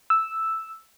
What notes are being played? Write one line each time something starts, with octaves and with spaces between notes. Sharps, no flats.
E6